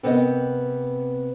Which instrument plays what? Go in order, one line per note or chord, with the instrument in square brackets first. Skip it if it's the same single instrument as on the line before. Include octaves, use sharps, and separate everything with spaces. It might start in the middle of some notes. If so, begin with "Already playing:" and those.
[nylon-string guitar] C3 B3 C4 A#4 D5 D#5